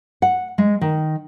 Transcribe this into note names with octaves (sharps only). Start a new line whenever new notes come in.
F#5
G#3
D#3